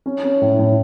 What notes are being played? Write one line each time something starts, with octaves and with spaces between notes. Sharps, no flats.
C#4
C#4
A2
A2